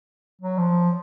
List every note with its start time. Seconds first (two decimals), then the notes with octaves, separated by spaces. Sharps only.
0.42 F#3
0.58 F3